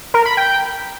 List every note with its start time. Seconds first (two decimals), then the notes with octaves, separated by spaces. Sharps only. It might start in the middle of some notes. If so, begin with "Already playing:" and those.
0.14 A#4
0.26 B5
0.37 G5